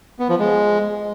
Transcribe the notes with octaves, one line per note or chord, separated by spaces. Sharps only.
B3
F3
G#3